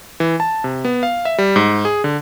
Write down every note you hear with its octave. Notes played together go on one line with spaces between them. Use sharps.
E3
A5
C3
B3
F5
E5
G3
G#2
G#4
D3